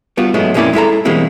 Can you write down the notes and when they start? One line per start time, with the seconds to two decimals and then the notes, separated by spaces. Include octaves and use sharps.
0.17 G3 B3 F4 F#4
0.34 G#2 F#3 G#3 A3 B3
0.54 F2 A#2 A#3 C#4 E4 D5
0.73 G#3 E4 A4 A#5
1.05 B2 E3 G3 G#3 A#3 C4